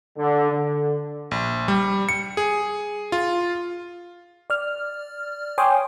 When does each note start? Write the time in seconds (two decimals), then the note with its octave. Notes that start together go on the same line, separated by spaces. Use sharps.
0.18 D3
0.52 D3
1.31 A#1
1.68 G3
2.09 C#7
2.37 G#4
3.12 F4
4.50 D5 F6
5.58 C#5 G5 G#5 C6 D6 D#6